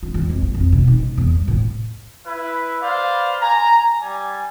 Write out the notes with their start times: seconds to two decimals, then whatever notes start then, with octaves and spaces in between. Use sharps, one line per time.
0.03 F4
0.14 E2
0.30 F2
0.42 A#1
0.54 F2
0.72 B2
0.87 D#4
1.00 B2
1.17 E2
1.35 G3
1.48 A2
2.26 E4 B4
2.82 B4 C5 D5 F5
3.40 G#5 A#5
4.01 G3 G#5